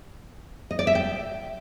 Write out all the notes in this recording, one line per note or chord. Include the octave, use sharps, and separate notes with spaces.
D#5
D5
E5
G5